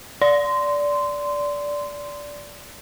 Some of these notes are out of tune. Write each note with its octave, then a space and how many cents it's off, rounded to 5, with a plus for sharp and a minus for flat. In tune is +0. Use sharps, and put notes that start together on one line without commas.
D5 -15 C6 -15